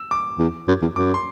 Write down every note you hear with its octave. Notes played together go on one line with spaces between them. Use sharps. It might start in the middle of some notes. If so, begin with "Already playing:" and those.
Already playing: E6
D6
E2
F#2
E2
F#2 D6
C6